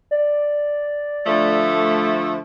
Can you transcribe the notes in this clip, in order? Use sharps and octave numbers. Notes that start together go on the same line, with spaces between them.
D5
D3 F3 A3